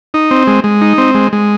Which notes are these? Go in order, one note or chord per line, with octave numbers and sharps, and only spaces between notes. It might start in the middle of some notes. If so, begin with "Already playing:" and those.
D#4
C4
G#3
G#3
D#4
C4
G#3
G#3